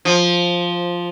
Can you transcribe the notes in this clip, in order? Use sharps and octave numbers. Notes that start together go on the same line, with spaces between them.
F3